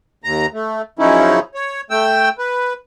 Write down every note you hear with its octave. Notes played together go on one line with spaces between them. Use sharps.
D#2 A#5
A3
F#2 C#3 F3 C#4 D#4 E4
C#5
A3 G5 E6
B4